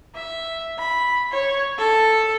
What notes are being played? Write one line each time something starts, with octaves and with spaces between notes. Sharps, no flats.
E5
B5
C#5
A4